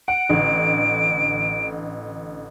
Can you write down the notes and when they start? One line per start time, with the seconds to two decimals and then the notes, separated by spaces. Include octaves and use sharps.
0.08 F#5 D7
0.30 A1 D3